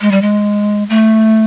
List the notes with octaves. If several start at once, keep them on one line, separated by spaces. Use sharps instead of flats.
G#3
G3
G#3
A3